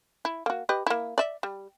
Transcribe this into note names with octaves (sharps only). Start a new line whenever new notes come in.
E4
A#3 F#4
G4 B4 D#5
A#3 E4
D5 E5
G3